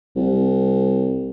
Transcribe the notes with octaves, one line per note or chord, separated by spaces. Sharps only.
C2